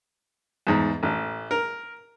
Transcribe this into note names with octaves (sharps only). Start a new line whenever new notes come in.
E2 G#2
A1
A#4